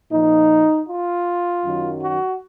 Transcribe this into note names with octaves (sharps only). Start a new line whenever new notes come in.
A#2 F3 D#4
F4
F#2 D#3 F#3
F#4